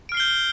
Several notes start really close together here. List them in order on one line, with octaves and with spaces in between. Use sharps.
D7 F6 C7 G7 G6